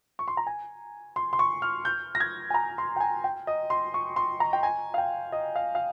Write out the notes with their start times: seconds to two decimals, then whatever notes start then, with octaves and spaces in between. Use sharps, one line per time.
0.19 C#6
0.28 C6
0.37 A#5
0.47 G#5
1.16 C6
1.33 C6
1.39 C#6
1.62 F6
1.85 G6
2.15 A#6
2.20 G#6
2.50 G#5
2.54 A#5
2.78 C6
2.96 G5
3.00 G#5
3.24 G5
3.47 D#5
3.70 C6
3.94 C#6
4.16 C6
4.40 A#5
4.53 G5
4.63 G#5
4.94 F5
4.98 G5
5.32 D#5
5.56 F5
5.75 F5